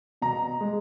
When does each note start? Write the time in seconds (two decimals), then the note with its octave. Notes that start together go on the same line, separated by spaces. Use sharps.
0.22 B2 A#5
0.61 G#3